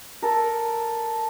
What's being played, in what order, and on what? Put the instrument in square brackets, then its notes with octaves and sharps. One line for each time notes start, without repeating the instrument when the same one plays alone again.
[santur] A4 A#4